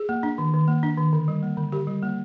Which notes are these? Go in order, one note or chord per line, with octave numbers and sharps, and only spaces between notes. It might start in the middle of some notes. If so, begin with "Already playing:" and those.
Already playing: G#4
A#3
D4
D#3
D#3
A#3
D4
D#3
D3
G3
A#3
D3
D3 G4
G3
A#3